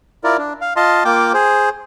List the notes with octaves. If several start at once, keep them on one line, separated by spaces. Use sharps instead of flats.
E4 F4 A#4 D5
D4
F5
F4 D#5 A5 C6
A#3 F4 G5 D6
G#4 C5